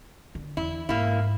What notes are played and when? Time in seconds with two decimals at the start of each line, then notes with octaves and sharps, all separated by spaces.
0.35 D3
0.57 E2 E4
0.89 G#2 A#3 E4